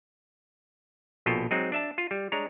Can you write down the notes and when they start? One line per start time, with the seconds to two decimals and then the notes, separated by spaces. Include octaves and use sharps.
1.26 A#1 B2 F4 A4 G5
1.51 F#3 G#3 C4 D#4
1.72 D4 E5 A5
1.98 F4
2.11 G3
2.32 G#3 D4 C#5 A#5